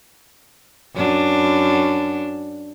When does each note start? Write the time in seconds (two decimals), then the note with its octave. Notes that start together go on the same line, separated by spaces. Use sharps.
0.95 F#2 D4